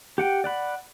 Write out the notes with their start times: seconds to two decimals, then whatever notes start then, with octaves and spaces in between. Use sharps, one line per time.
0.18 G4 F#5 G5
0.44 D5 F#5 B5